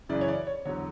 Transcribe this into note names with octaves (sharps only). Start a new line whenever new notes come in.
F#2 C#3 E3 D5
C#5
D5
C#5
E2 D3 F#3 C#5